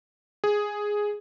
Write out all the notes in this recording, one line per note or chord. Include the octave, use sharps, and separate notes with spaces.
G#4